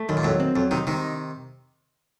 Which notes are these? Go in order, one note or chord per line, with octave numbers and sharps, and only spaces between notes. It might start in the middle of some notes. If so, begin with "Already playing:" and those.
Already playing: A3
F#2 D#3
A#2
F2 A2 F#3
C4
F2 F#3
C3 D#3 D#4
C3 D#3 D#4